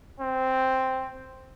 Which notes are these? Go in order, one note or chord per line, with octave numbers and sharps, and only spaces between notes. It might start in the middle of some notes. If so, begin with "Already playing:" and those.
C4